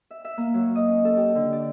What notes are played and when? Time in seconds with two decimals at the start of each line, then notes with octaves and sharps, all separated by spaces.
0.11 E5
0.25 E5
0.38 A#3
0.54 F#3
0.75 D#5
0.88 C#4
1.05 A4
1.17 G4
1.35 D3
1.53 D5